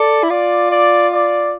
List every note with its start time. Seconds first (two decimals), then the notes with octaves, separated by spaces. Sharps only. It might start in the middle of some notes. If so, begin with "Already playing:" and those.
Already playing: A4 D5
0.23 E4
0.30 F4 D5
0.71 D5
1.11 D5